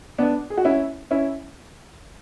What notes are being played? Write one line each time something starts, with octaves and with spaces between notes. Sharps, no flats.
B3 D4
G#4
F#4
C#4 E4
C#4 E4